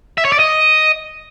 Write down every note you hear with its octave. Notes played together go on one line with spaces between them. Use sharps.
E5
C#5
D5
D#5